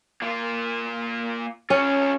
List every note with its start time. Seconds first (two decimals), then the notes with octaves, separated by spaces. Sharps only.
0.22 A#3 F4
1.70 C#4 F4 G#4 C#5